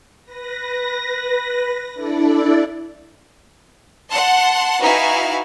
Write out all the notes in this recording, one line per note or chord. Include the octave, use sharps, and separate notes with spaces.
B4 A#6
D4 E4 A4 D5
F#5 A5 C6
D#4 E4 F#4 B4 F5 G#5